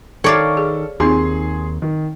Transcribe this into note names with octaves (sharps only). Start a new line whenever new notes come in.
D#3 A4 C#5 D5 F5
G#4
D#2 C4 D#4 F4 G#4 C6
D#3